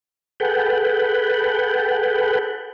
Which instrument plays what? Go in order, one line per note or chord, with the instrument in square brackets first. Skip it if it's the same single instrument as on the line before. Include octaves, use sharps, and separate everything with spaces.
[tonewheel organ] G#4 A4 B4 F#5 G5